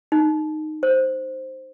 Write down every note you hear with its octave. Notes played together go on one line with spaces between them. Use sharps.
D#4
C5